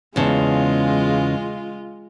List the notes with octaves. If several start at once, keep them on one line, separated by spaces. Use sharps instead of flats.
E2 C#3 G#3 F4 A5